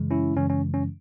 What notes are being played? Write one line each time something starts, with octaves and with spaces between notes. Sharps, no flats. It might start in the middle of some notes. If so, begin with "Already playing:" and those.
Already playing: F#2 C#3 E3 G#3
C#4 E4
F#2 C#3 E3 G#3 C#4
C#4
C#4